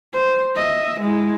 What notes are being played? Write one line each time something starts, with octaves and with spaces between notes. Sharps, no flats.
C5
D#5 E5
G#3 E4